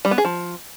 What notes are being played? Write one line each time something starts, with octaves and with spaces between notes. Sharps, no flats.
G3
B3
G#4
F3